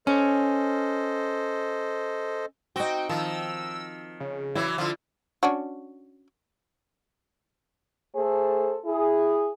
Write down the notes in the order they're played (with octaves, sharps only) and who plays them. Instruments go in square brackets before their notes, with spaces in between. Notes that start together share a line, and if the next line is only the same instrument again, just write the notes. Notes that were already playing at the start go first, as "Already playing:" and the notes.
[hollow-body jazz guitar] C#4 [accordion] A4 C5 D#5
[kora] C4 D#4 [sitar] F#4 [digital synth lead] G5
[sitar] D#3 [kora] F3 [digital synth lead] E6
[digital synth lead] C#3
[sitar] E3 F#3 [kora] E4
[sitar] D3 F3 [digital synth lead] F4
[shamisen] C#4 D4 F#4
[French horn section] A3 G#4 A4 C5
E4 G#4